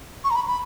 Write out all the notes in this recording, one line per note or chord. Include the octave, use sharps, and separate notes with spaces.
C#6
A#5
B5
B5